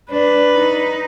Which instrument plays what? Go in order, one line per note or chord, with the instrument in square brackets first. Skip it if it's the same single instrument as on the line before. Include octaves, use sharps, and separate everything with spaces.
[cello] D4 [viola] B4
[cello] D#4